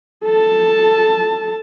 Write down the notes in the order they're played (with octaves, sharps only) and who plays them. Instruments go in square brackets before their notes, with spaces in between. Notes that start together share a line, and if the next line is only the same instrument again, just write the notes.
[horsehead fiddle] A4 A5